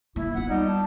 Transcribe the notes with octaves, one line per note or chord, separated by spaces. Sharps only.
A#3 E4
B3 F4 F#5
G3 D#4
A5